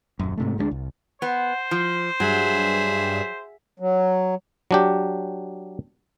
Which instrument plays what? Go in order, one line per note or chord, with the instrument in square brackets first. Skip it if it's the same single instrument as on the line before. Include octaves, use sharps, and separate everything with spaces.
[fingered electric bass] D#1 G#1 F#2
G#2 C3 A3
D2 G#3 B3 D4
C2
[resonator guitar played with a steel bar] B3 [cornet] C5
[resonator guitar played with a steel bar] F3
[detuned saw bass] G2 [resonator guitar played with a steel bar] F#3 [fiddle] G#4 E5
[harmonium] F#3
[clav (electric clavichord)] F#3 D4 G4